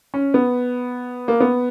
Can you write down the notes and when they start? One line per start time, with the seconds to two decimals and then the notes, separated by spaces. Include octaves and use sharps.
0.14 C#4
0.34 B3
1.28 A#3
1.40 B3